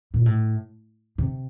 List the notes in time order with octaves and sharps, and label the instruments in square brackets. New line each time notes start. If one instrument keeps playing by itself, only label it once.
[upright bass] A#2
A2
C3